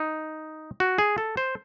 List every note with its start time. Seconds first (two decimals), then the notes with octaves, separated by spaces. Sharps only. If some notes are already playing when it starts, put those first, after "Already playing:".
Already playing: D#4
0.80 F#4
0.98 G#4
1.18 A4
1.37 C5